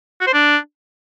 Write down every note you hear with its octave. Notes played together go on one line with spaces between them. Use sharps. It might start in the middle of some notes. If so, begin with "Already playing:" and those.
F#4
C5
D4